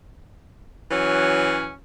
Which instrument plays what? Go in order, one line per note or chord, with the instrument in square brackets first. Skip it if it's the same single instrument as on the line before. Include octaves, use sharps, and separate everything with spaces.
[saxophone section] E3 F#3 C#4